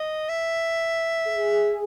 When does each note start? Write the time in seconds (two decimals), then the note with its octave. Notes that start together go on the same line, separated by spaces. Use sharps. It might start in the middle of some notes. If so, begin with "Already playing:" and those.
Already playing: D#5
0.29 E5
1.28 G#4